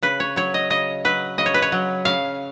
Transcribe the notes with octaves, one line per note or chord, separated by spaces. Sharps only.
C#3 B4
C#5
F#3 C#5
D#5
C#3 D#5
F#3 B4
C#3 D#5
C#5
B4
C#5
F#3
C#3 F5